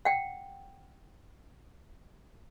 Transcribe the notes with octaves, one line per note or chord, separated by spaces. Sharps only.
F#5 G5